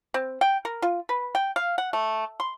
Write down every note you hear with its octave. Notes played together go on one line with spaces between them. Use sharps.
C4
G5
A#4
F4
B4
G5
F5
F#5
A3
C6